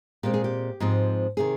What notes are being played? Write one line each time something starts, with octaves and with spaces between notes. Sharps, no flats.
A#2 G#3 C4 G4
G#4
G4
G#2 F3 G#3 C4
C3 D#3 G#4